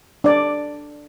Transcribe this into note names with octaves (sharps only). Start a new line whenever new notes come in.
D4 D5